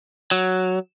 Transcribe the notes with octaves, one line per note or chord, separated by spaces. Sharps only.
F#3